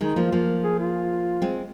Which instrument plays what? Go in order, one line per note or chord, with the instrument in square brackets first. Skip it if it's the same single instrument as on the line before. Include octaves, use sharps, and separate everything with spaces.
[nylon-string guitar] D#3 G#3 [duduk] D#4
[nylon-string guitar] F3 A#3
[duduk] F4
[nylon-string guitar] F3 A#3
[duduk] G#4
F4
[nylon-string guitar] G#3 C4